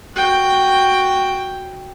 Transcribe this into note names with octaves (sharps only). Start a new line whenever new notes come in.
F#4 G5